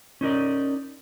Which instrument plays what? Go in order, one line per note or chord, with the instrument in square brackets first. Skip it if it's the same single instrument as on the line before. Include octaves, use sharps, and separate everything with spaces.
[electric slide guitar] C#4 D#4 A#4 D5